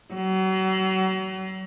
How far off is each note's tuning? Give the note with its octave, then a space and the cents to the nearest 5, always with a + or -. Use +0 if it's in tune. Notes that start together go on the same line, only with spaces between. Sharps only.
F#3 +35